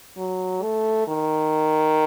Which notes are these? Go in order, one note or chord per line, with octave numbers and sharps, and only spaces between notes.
F#3
A3
D#3